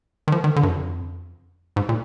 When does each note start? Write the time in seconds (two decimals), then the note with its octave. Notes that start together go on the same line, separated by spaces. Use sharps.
0.28 D#3
0.32 F3
0.44 D#3
0.56 D3
0.63 G2
0.68 F2
1.76 G#2
1.89 A#2